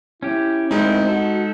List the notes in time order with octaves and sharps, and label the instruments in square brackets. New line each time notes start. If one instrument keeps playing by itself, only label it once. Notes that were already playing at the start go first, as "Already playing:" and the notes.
[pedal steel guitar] C#4 G4 [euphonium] E4
[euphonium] D2 [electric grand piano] G#3 D#4 [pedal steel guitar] C4 E4 A#4
[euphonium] F#4 [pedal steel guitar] A4